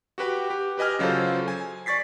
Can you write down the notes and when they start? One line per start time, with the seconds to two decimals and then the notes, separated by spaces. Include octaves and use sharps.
0.18 F#4 G4 B4 G5
0.50 G4
0.78 G4 B4 D#5 G#5 F6
0.99 C#3 F#3 F4 A4 C5
1.48 G#5
1.86 D5 C#6 A6 B6 C7